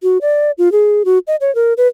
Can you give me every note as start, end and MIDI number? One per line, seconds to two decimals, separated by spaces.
0.03 0.18 66
0.22 0.51 74
0.58 0.71 65
0.72 1.03 68
1.05 1.19 66
1.27 1.36 75
1.41 1.53 73
1.55 1.73 70
1.77 1.87 71